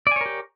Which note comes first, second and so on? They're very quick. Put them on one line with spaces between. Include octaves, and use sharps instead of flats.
D5 G#5 C#5 A#4 G4